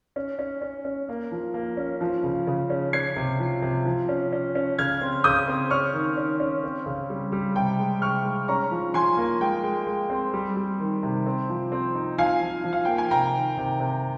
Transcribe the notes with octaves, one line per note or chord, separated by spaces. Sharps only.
C#4
C#4
C#4
C#4
A#3
F3
A#3
C#4
F3
C#3
C#3
C#4
C#4 G#6 C7
C3
F3
C3
F3
C#4
C#4
C#4
C#3 F6 G#6
C4
C#3 D#6 G6
C4
C#4 C#6 F6
D#3
C#4
C#4
C4
C#3
G3
G3
C3 G5
G#3
C3 C#6 F6
G#3
C#4 A#5 C#6
F3
F3 G#5 C6
A#3
G#3 G5
G#3
G#3
C4
G3
G3
D#3
C3
C4
F3
C4
D#4
F3 F5 G#5
F3
F3
F5
A#3 G5
G#5
C3 G5 A#5
D#3
C3
C3